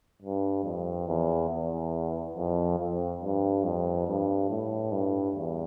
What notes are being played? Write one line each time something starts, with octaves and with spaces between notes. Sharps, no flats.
G2
F2
E2
E2
F2
F2
G2
F2
G2
A2
G2
E2